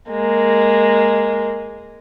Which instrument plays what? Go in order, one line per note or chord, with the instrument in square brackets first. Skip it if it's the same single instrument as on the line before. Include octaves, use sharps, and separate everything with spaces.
[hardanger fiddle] G#3 A#3